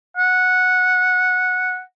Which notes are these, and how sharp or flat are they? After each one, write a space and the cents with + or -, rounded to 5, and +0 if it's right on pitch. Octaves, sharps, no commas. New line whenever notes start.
F#5 -10